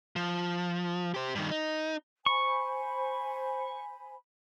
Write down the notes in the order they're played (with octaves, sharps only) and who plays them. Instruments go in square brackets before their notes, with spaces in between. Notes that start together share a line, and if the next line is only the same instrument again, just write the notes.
[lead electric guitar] F3
G4 C5
G2 D#3
D#4
[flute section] C5 G#5 B5 [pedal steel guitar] C#6